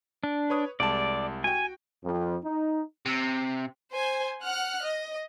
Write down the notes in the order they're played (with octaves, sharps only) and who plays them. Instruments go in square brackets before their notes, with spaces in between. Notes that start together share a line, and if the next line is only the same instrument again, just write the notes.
[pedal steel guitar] D4
[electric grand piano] B4 C#5 D#6
[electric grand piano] C2 G#3 A5 [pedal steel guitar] D5
[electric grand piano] F#4 G5 [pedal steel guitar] G#5
[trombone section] F2
D#4
[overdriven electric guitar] C3
[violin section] C5 G#5
F#5 F6 F#6
D#5